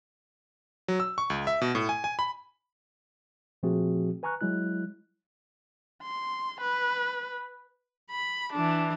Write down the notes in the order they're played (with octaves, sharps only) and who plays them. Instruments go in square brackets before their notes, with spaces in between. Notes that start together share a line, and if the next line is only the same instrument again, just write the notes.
[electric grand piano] F#3
E6
C#6
C#2
E5
B2
A2
G#5
G#5
B5
[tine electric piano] A#2 F3 A3 C4 F#4 G#4
B4 G#5 A#5 C#6 F6 F#6
F#3 G#3 E4 F#6
[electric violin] C6
B4
[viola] B5
E3 D4